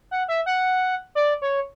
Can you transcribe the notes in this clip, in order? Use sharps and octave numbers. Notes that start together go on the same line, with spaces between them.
F#5
E5
F#5
D5
C#5